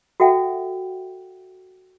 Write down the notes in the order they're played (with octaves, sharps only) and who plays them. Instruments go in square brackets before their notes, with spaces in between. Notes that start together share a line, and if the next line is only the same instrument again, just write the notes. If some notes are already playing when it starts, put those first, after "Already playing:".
[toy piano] F#4 A4 E5 F#5 G5